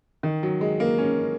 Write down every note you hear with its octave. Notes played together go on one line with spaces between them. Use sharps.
D#3
F#3
G#3
A#3
C#4